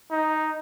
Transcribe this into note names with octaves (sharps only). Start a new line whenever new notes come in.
D#4